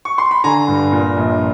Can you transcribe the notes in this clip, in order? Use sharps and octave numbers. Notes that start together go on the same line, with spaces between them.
C#6
C6
B5
D3 G#5 A#5
G2
A#2
A#1